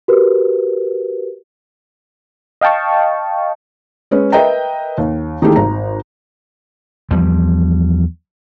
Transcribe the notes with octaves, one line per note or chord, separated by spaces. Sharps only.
F#4 G4 A#4 B4
D#5 F5 G5 A5 C#6
G#3 C#4 B4
A#4 B4 D#5 E5 G5 A#5
D#2
D#3 E3 A3 A#3 G4 G#4
G#1 A#5
E2 F3 G3